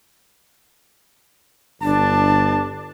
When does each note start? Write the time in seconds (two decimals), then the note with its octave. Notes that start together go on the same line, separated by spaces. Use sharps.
1.82 G1 D4 A5